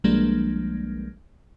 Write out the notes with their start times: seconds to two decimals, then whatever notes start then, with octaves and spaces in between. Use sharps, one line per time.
0.04 B1 F3 G3 G#3 A#3 D4